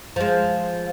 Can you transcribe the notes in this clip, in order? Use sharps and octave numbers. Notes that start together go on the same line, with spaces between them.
F3 G#3